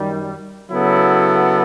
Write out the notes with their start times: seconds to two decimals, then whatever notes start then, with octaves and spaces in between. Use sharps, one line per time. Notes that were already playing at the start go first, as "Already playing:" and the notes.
Already playing: F#2 D#3 G3
0.70 C#3 F#3 B3 E4 A4